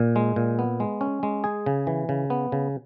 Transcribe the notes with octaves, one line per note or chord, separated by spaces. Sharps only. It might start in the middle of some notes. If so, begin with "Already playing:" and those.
Already playing: A#2
G#3
A#2
B3
G#3
C#4
G#3
G#4
C#3
E3
C#3
B3
C#3